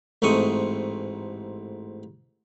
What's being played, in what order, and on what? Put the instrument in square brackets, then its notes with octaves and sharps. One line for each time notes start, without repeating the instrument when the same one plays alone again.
[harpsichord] A1 G#2 A3 C4 C#6 D#6